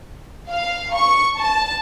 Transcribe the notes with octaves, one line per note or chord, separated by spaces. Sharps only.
F5
C#6
A5